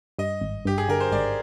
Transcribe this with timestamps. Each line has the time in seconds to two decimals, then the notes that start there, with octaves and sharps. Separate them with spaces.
0.19 G2 D#5
0.41 G#1
0.65 G2 G4
0.78 G#4
0.89 D3 A#4
1.00 C5
1.12 G#1 D5